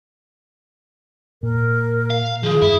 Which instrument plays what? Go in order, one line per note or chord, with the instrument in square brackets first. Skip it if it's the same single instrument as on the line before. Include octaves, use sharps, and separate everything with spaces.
[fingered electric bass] A#2 [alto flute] A#4
[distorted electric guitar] F5
[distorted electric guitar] D#3 F3 [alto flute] G#4
[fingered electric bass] G2 [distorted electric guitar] E4